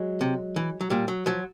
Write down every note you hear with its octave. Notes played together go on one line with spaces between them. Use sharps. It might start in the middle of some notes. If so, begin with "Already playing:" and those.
Already playing: F#3 G#3
C3
E3
F#3
A#2 G3
F#3
F3 F#3